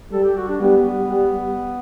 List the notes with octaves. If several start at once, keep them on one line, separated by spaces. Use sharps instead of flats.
G3 A4
G4
F#4
D4
G3 B3
G3